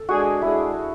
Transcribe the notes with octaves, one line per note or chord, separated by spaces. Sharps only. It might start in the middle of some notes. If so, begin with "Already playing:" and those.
Already playing: A4
G#3 D4 F#4 G#4
G#3 D4 E4 G#4